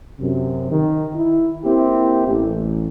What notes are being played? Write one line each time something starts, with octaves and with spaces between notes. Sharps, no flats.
F#2 C3
D#3
E4
A#3 C4 E4 G4
A1